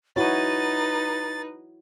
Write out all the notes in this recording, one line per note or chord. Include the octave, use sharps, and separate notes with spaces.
D#4 E4 F#4 B4 C#5 A6